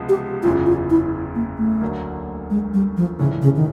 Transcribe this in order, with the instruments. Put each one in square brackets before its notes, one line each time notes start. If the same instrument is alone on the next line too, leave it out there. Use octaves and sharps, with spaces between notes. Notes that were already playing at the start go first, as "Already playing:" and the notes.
Already playing: [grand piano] C#2 C3 F3 G#3 B3
[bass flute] G4
[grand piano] F#1 E2 C#3 E3 [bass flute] F4
[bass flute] F4
E4
A#3
A3
[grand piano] D2 D3 F#3 A#3
[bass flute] G#3
G3
F3
[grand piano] A#1 G#2 E3 A3 C#4 [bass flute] C#3
[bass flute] C#3
D#3